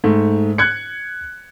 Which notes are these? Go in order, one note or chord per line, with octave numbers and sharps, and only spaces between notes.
G#2 A3
F#6 G#6 C#7